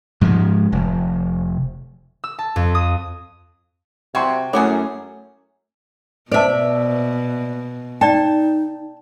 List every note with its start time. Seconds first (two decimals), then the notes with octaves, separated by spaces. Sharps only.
0.21 G#2 F3 F#3 G#3
0.72 F1
2.24 E6
2.39 A5
2.56 F2
2.75 D#6
4.15 C3 C4 F#4 G5 C6 G#6
4.53 F#2 A3 C#4 E4 F#4 G#4 C#5 D6
6.32 B2 B4 C5 D5 E5 A5
8.01 D#4 D5 G5 A5